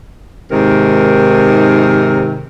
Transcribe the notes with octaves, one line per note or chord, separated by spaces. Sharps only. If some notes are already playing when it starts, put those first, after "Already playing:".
G#2 C3 D#3 A#4